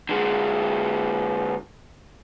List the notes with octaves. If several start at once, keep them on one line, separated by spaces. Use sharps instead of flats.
D3 G#3